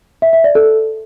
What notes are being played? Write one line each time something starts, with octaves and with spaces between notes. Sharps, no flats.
E5
E5
D5
A4